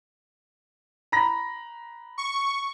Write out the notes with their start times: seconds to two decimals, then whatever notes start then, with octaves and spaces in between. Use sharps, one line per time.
1.12 A#5 B5 A#6
2.18 C#6